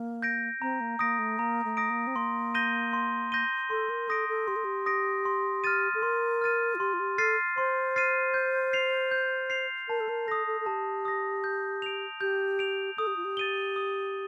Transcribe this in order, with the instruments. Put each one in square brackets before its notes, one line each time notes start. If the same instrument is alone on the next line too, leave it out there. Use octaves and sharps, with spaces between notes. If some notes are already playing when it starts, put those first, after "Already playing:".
Already playing: [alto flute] A#3
[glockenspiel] G6 A#6 D7
[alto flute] C4 [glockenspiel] A#5
[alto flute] A#3
[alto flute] A#3 [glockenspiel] D#6 A#6 D7
[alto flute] A3
[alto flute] A#3 [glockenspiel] A#5
[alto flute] A3
[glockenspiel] D#6 A#6 D7
[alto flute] A#3
C4
[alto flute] A#3 [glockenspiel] C6
[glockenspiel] G6 A#6 D#7 G7
C6
G6 A#6 D#7 G7
[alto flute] A4 [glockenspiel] C6
[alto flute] A#4
[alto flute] A4 [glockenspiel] D#6 A#6 D7
[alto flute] A4
[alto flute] G4 [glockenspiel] C6
[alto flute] A4
G4
[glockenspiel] D#6 A#6 D7
C6
F6 A6 D#7
[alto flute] A4
[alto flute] A#4 [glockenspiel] C6
[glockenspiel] F6 A6 D#7
[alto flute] F4
[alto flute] G4 [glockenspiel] C6
[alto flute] F4
G4
[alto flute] A4 [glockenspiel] F6 A6 C7 D#7
[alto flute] C5 [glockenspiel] C6
[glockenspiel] F6 A6 C7 D#7
G6
C7 F7
G6
C7 F7
[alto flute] A#4 [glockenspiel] A5
[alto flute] A4
A#4
[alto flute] A4 [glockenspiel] D#6 A#6
[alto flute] A4
A4
[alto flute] G4 [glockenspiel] A5
[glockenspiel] D#6 A#6
G6
D7 F7
[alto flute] G4 [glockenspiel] G6
[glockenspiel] D7 F7
[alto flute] A4 [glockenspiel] D#6
[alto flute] G4
F4
G4
[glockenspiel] A6 D#7 G7
D#6